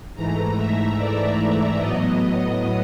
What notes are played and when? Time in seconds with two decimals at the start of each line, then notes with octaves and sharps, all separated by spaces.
0.15 G#2 E3 A3 A#5
0.56 E5
0.97 D5
1.79 A2 F#3 B3 D#5
2.21 D#5